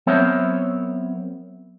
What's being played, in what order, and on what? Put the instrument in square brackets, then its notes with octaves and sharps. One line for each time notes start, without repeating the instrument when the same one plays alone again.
[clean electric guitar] F#3 B3 C4 A#4 C#5 E5